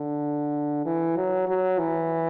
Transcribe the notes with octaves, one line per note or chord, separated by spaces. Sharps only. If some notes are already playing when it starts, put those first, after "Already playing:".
Already playing: D3
E3
F#3
F#3
E3